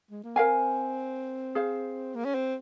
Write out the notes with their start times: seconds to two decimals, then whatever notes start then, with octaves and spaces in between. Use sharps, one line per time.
0.11 G#3
0.24 A#3
0.36 C4 A#4 F5 G#5
1.55 G#4 C5 F5
2.15 A#3
2.25 C#4
2.35 C4